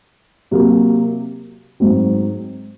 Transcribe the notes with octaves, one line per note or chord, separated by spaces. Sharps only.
C3 F#3 A#3
G#2 F#3 C4